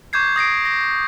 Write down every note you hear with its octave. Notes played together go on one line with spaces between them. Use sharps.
C#6 D6 G6 G#6 C7
D#6 A#6 C7 D7
A#6